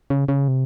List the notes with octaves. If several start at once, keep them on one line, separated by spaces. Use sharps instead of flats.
C#3
C#3
C3